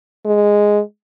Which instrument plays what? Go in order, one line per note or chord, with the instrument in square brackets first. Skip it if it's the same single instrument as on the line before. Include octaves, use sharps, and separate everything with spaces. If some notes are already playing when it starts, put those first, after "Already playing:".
[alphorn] G#3